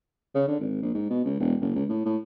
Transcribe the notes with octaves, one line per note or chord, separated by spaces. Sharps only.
C#3
D3
G#1
A#1
G#2
B2
C#2
E1
F#1
C#2
A2
A2